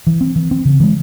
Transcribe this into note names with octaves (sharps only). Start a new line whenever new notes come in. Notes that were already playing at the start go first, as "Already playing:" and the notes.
E3
C4
E3
C4
C#3
E3 G#3